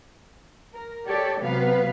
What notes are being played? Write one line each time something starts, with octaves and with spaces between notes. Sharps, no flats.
A#4
G4 A4 C#5 D5
C3 F#3 B3 B4 F5